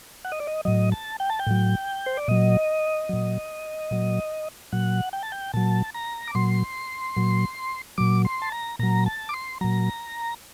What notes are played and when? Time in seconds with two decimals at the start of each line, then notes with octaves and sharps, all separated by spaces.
0.25 F#5
0.32 D#5
0.40 D5
0.47 D#5
0.65 A2 F#3 D#5
0.92 A5
1.20 G5
1.30 A5
1.39 G5
1.47 A2 F#3
2.06 C5
2.17 D5
2.28 A#2 F#3 D#5
3.09 A#2 F#3
3.91 A#2 F#3
4.72 A#2 F#3 F#5
5.13 G5
5.23 A5
5.32 G5
5.54 A#2 F#3 A5
5.94 A#5
6.27 D6
6.35 A#2 F#3 C6
7.16 A#2 F#3
7.98 A#2 F#3 D6
8.25 C6
8.42 A5
8.52 A#5
8.79 A#2 F#3 A#5
9.06 A5
9.29 D6
9.34 C6
9.61 A#2 F#3 A#5